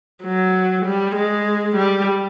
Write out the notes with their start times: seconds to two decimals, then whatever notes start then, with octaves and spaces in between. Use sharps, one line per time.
0.23 F#3
0.85 G3
1.15 G#3
1.77 G3